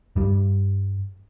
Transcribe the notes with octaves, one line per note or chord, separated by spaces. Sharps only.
G2 G3